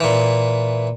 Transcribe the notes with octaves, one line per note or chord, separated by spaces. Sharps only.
A#2 E3